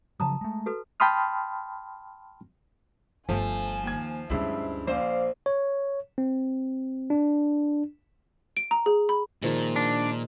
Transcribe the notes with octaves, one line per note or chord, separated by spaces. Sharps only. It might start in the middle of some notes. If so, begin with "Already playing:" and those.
C#3 F3 F#3 A5 A#5 D#6
G#3 A3
F#4 A4 B4
G5 A5 B5 C6 D#6 F6
G1 F3 G3 A3 G#5
D#2 G#6
D2 G2 G#3 C#4 E4 E5
A#1 C5 D5 F5
C#5
C4
D4
D7
A#5
G#4
B5
A#2 D#3 F3 G#3
D4